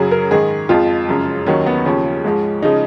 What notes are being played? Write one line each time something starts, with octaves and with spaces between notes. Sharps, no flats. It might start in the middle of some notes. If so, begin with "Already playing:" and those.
Already playing: F#2 C#3 F#3 G#4
A#4
G#2 D#3 G#3 G#4
F2 F3 G#3 F4
F#2 C#3 F3 G#3
D#2 D#3 F#3 C#4
B3
D#2 C#3 F3 C#4
G#2 F3 G#3
C#3 F3 G#3 D#4